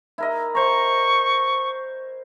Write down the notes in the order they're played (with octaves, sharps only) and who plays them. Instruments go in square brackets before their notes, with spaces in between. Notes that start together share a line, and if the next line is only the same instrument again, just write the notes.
[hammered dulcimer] E4 A#4 D#5
[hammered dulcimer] C5 A#5 [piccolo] C#6